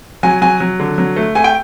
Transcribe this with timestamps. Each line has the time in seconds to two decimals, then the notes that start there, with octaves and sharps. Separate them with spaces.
0.23 F#3 G#5
0.42 F#3 G#5
0.60 F#3
0.80 D3
0.98 F#3
1.16 A3
1.35 A3 G#5
1.44 G5